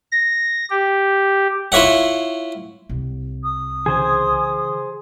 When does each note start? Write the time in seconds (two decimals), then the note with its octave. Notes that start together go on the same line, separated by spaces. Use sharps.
0.11 A#6
0.70 G4
1.72 E4 F4 C#5 E5 F#5
2.89 C2
3.43 D#6
3.86 C#3 E3 G#4 C5 G#5